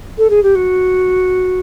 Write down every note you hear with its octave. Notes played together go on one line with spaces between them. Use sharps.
A4
G#4
G4
F#4